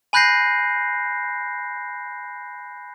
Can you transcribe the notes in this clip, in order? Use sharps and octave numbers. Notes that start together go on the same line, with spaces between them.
G#5 B5 F#6 G6 A#6 C7